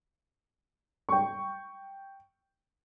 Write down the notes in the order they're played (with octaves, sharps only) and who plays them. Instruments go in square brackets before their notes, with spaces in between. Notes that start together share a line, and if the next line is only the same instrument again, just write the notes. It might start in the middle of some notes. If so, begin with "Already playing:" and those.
[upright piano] G5 C#6